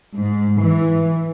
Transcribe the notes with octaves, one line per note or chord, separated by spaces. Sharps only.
G#2
E3